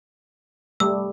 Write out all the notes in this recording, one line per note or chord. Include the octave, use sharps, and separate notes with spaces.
G3 A3 E6